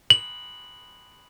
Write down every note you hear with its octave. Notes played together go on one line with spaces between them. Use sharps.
F#7